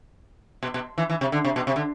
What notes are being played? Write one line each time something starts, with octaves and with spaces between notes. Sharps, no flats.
B2
B2
E3
E3
C3
D3
C3
B2
C3
D3